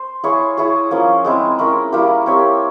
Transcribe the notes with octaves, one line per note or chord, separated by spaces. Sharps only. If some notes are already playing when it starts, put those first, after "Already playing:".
Already playing: C5
E4 G#4 C#5 F5
E4 G#4 C#5
F3 A#3 C#4
G#3 C4 E4
C#4 E4 A#4
G3 A#3 E4 G4
C4 G4 C#5 E5